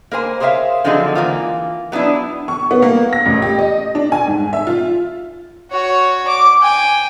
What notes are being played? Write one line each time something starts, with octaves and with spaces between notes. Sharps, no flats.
A#3 A#4 C5 G#5
G#4 A#4 C5 C#5 E5 F5
D3 F3 F#3 C4 D#4 G#4
E3 A#3 F4
F#3 B3 D4 E4
C#6
B3
A#3
A#6
A1
G4
D#5
D4
G#5
G#2
E5
F4
F#4 C#5
D6
G5 G#5